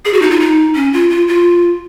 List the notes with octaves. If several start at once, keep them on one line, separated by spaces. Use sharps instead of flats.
G#4
F#4
D#4
F4
D#4
C#4
F4
F4
F4